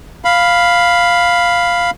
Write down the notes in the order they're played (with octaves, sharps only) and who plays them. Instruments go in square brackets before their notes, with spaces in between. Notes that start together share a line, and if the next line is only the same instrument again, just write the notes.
[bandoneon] F5 B5